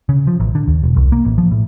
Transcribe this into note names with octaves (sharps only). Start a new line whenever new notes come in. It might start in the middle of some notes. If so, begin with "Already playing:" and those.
C#3
F3
A1
D3
D#2
E1
C2
A#3
A1
F3
A2